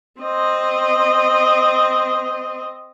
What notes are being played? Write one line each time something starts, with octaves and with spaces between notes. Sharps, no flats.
C4 D#5